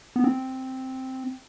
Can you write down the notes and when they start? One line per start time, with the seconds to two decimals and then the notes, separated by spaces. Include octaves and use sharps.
0.16 B3
0.24 C4